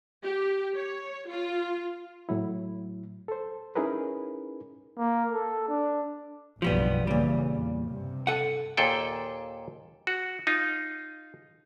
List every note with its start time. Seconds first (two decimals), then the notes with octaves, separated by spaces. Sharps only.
0.22 G4
0.75 C#5
1.27 F4
2.29 A2 F#3 E4
3.28 A4 C5
3.75 C#4 D#4 E4 G#4 A#4 B4
4.98 A#3
5.32 A4
5.68 D4
6.62 F#1 B1 G2 F3 G3 B3
7.07 G2 A#2 C#3 E3 G3
7.50 E2
7.86 G2 C3
8.27 A4 F#5
8.77 D#2 A#2 G#4 A4 G5
10.07 F#4
10.47 D#4 F4